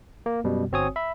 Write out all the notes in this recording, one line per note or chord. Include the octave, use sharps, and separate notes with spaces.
A#3
F#2 B2 G3
G1 C4 F#4 C#5 G#5 D#6
E5 B5